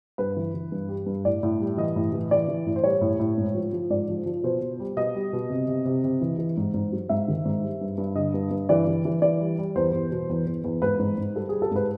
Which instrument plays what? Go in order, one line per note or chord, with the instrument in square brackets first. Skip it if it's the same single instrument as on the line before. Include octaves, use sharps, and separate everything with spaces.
[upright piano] G2 B4
E3
E3
G2
G3
G2
A2 D5
A2
G3
E3 D#5
A2
E3
E3 D5
E3
A2
C5
G3 C#5
A2
A2
G#2
F3
F3
G#2 D5
F3
F3
B2 C5
B2
G3
B2 D#5
G3
B2
C3
C3
C3
C3
E3
E3
G#2
G#2
F#3
G#2 E5
D#3
G#2
G3
G2
G2
D3 D#5
G2
G2
E3 D5
E3
E3
E3 D5
G3
G3
E2 C5
E2
B2
E2
E2
E2
G#2 B4
G#2
G#2
G3 A4
G3 G#4
A4
G#2 B4